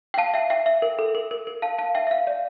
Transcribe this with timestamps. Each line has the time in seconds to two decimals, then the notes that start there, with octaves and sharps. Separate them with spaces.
0.14 G5
0.18 F5 A5
0.34 E5 G5
0.50 E5 G5
0.66 E5
0.82 A#4
0.99 A4
1.15 A#4
1.31 A#4
1.47 A#4
1.62 F5 A5
1.78 F5 A5
1.95 E5 G5
2.07 E5
2.11 F5
2.27 D5